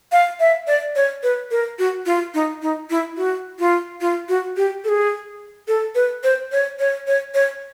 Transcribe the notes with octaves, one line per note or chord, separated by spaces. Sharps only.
F5
E5
D5
C#5
B4
A#4
F#4
F4
D#4
D#4
E4
F#4
F4
F4
F#4
G4
A4
G#4
A4
B4
C5
C#5
C#5
C#5
C#5